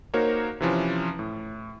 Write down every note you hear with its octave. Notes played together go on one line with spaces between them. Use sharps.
A#3 D#4 F#4 A#4 C5 C#5
C3 E3 F3 C#4
A2